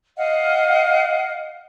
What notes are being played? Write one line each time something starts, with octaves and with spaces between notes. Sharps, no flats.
D#5 F5 F#5